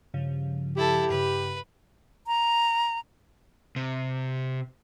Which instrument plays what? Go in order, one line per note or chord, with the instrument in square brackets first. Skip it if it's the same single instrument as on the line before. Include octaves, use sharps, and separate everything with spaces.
[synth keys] G2 C#3 F3
[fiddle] E4 A4 [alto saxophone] G4
[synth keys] G2 C#3 [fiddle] B4
[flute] A#5
[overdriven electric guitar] C3